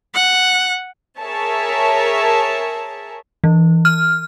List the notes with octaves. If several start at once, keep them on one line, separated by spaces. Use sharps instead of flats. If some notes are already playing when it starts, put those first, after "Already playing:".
F#5
G#4 A#4 C#5 E5 A5
E3
F6